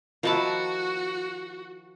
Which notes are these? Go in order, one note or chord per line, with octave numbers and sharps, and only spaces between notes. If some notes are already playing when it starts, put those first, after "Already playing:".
D#3 F3 E4 F#4 A5 D6